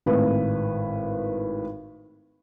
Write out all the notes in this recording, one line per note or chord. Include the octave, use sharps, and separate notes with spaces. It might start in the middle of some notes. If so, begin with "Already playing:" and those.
G#1 A2 B4